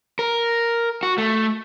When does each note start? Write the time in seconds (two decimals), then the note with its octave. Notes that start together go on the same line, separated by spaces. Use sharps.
0.19 A#4
1.03 F#4
1.18 A3